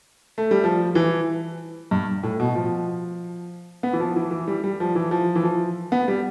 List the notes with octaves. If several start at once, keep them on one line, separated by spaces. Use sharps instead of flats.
A3
G3
F3
E3
G2
A2
B2
F3
B3
E3
F3
E3
E3
G3
G3
F3
E3
F3
E3
F3
B3
G3